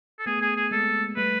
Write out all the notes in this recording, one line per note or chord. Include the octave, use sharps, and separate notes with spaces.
A4
A3 B3 G#4
G#4
G#4
G#3 A#3 A4
G3 A3 B4